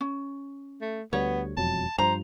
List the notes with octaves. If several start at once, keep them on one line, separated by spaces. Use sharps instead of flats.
C#4
A3
D2 G3 B3 C#5
E1 F2 F#3 A5
G2 F3 C5 A#5